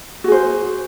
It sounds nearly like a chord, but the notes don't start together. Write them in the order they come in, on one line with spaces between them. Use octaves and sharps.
F#4 G#4 C5